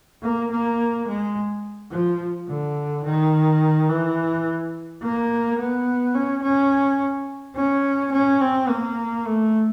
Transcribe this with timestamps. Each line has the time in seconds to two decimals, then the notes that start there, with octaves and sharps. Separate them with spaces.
0.23 A#3
0.51 A#3
1.08 G#3
1.92 F3
2.48 D3
3.05 D#3
3.89 E3
5.02 A#3
5.59 B3
6.15 C#4
6.42 C#4
7.55 C#4
8.12 C#4
8.41 C4
8.68 A#3
9.25 A3